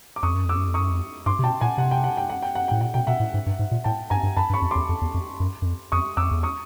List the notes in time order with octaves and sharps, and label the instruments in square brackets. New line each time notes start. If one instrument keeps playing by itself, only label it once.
[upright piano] D6
[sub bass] F2 [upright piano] C#6 D#6
[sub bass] F#2
[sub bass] F2 [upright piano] D6 E6
[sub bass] F#2
F2
[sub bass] F#2 [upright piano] C#6 D#6
[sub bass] F2
[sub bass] G2 [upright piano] C6 D6
[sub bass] C3
[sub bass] B2 [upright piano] G5 A5
[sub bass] A#2 [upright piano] F#5 G#5
[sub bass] C3 [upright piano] F#5
[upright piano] G5
F#5
G5
F#5
G5
F#5
[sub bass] A2 [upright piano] G5
[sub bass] A#2 [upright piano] F#5
[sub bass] B2 [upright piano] G5
[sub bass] B2 [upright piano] E5 F#5
[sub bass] A2
G#2
G2
G#2
A#2
[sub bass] A2 [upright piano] G5 A5
[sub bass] G2 [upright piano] G#5 A#5
[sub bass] G2
[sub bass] F#2 [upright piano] A5 B5
[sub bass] G2
[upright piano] B5 C#6
[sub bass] F2
[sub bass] E2 [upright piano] C6 D6
[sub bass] F2
E2
F2
F#2
F#2
F2
[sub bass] F2 [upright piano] C#6 D#6
[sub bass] F2 [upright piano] D6 E6
[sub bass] E2
[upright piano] C#6 D#6